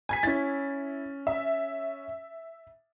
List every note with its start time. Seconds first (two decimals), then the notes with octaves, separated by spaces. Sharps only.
0.09 G#5 G#6 B6
0.23 C#4 E4 A6
1.27 E5